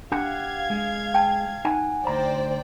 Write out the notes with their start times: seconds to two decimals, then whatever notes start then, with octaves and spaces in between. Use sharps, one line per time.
0.12 D4 G4 F5 F#5 G#6
0.70 G#3
1.14 G5 A5
1.65 D#4 F#5 G#5
2.07 D2 C5 D5 G5 A#5